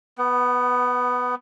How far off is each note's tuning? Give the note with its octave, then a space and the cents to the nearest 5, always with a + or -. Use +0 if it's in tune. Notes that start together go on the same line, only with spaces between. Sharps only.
B3 +0 F#5 +30